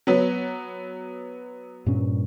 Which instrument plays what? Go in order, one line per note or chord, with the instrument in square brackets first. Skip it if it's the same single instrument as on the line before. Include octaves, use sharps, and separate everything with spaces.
[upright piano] F#3 B3
[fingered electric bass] G2 A#2 C#4